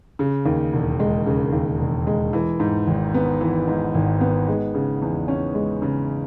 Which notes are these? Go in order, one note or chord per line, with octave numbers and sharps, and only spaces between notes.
C#3
D#2
E1
G#3
C#3
D#2
E1
G#3
E3
G#2
G#1
B3
E3
G#2
G#1
B3
G#3
C#3
E2
C#4
G#3
C#3